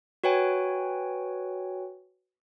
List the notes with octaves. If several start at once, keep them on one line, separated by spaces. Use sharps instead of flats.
F#4 B4 C#5 G5 G#5